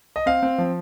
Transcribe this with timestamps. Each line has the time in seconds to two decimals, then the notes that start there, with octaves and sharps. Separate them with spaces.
0.16 D#5
0.26 C4 F5
0.43 C4
0.58 F3